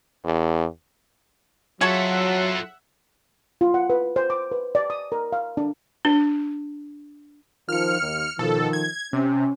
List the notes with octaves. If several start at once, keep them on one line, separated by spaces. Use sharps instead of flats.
E2
F#3 F4 G#4 A4 C#5 E5 F#5 A5
F4
F#5
B4
C5
D6
B4
D5
D#6
A#4
F5
D4
D4
D#3 F3 F6 C#7
D#2
B2 D#3 F3 A4
G#6
C3 C#4